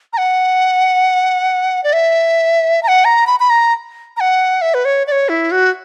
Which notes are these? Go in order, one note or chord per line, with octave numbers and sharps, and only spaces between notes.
A#5
F#5
D5
E5
A#5
F#5
A#5
B5
B5
A#5
A#5
F#5
E5
B4
C#5
D5
C#5
E4
F#4